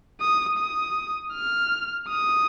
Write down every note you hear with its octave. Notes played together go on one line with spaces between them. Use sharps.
D#6
D#6
F6
D#6